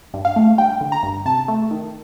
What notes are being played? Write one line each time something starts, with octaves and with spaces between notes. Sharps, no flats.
G2
F5
A3
G2 G5
D3
A#5
G2
C3 A5
A3
D#3